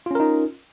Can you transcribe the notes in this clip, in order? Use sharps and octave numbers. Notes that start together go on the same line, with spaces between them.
C#4 D#4 F4 A#4